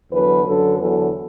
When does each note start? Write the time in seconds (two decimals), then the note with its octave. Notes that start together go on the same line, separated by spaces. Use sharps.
0.12 E2 D3 F#3 B4
0.45 F#2 D3 F#3 A4
0.78 E2 D3 F#3 A4